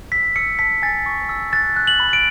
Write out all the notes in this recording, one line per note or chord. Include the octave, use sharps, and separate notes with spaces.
E6 B6
E6 C#7
A5 B6
G#5 A6
C#6
E6
F#6 A6
F#6
F#7
B5
D7